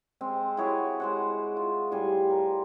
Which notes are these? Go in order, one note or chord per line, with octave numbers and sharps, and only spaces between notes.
G#3 C4
E4 F#4 G#4 C#5
G#3 C5 F#5
F4
A2 G3 C5 G#5
A#4